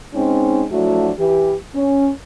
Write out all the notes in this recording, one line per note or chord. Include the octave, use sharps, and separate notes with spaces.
G#3 C4 C#4 D#4
F3 F#3 A3 D4 E4 F#4
E3 G4
C#4